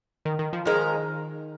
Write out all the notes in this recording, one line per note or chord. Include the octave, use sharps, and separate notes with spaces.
D#3
D#3
F3
D#3 F3 G#3 D#4 A#4